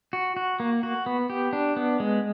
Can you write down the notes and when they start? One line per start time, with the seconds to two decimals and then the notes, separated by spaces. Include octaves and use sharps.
0.13 F#4
0.37 F#4
0.60 A#3
0.83 F#4
1.06 B3
1.30 G4
1.53 D4
1.76 B3
2.00 G#3